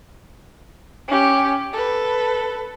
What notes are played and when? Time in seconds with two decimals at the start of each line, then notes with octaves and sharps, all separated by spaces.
1.08 C#4 G4
1.73 A4 B4